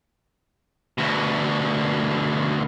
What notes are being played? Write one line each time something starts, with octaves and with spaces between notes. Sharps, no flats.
D2 B2